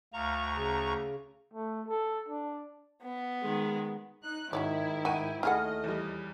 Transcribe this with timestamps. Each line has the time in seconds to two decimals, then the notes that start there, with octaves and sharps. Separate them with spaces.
0.13 D2 F5 A#5 C#6
0.55 C#3
1.53 A3
1.88 A4
2.28 D4
3.02 B3
3.42 D#3 G#3
4.23 D#4 F#6
4.53 G#2 D#3 F#3 E4 C#5 D5
5.05 F#4 G5 B5 D#7
5.43 D#2 A3 E4 G#4 D#5 F#5 F6
5.84 E2 G3